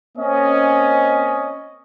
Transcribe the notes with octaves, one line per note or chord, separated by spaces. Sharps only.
A#3 C4 C#4 D#5